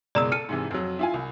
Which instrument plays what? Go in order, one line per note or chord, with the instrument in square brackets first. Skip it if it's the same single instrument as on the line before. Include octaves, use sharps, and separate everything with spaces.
[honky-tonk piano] F#1 B2 G#3 [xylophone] D5 A#5 E6
[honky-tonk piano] A4 [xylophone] F6 C#7 D#7
[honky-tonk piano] G#2 C3 E3
F2 F#3
E4 F4 G#5
C2